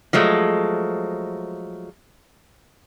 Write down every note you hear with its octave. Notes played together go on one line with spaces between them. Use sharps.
F3 F#3 G#3 A3